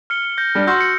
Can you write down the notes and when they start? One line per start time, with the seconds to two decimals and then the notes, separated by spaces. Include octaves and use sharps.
0.10 F6 C#7 G7
0.38 G6 A#6
0.55 G3 D4
0.67 F#4 C6 C#6 E6 G6 A#6
0.81 G6 C#7